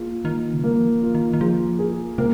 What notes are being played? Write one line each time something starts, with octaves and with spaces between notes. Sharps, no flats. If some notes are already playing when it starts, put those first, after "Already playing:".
Already playing: A#3 F4 G#4
D#3 A#3
C#3
D#3 A#3
F3
D#3
F4
D#3
D#3
F3 G#4
G#4
C3 A#3